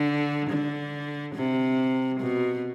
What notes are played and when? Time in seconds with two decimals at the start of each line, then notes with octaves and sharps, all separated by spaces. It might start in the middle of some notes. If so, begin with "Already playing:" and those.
Already playing: D3
0.50 D3
1.35 C3
2.20 B2